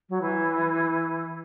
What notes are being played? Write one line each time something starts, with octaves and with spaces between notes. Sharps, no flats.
F#3
E3